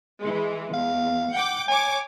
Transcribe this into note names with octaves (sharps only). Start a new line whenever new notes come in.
E3 G#3
E2 F5
F#5 G5 D6
C#5 G#5 D6